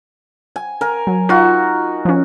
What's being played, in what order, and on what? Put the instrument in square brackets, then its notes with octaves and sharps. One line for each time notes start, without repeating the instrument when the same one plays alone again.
[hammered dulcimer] G#5
A#4 G#5
[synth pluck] F#3
[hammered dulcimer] D#4 F#4 [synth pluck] F4
[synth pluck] F3 C#4